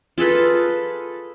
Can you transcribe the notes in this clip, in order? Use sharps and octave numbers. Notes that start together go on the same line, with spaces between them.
F4 G#4 A4 B4